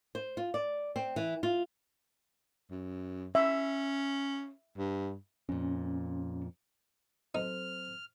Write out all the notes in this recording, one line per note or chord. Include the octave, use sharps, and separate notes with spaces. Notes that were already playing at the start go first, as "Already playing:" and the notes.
C5
F4
D5
C4
E3
F4
F#2
C#4 E5
G2
F2 A#2 C#4
F#3 C4 D#4 A4 C5 F6